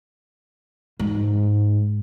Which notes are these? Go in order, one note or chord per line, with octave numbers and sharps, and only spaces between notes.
G#2